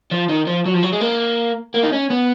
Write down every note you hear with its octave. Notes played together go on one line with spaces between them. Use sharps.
F3
D#3
F3
F#3
F3
F#3
G#3
A#3
A#3
D#4
C#4
B3